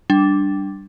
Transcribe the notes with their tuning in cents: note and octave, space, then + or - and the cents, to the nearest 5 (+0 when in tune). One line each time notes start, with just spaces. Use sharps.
G3 -10 D4 +0